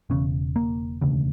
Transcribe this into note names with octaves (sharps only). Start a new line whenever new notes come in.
E1 E2 C#3 C#4
A#3
E1 D2 C#3